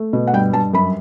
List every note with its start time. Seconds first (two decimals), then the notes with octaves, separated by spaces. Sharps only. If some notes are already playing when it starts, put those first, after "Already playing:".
Already playing: A3
0.13 B2
0.27 F#5
0.33 G2 G5
0.53 G2 A5
0.73 F#2 B5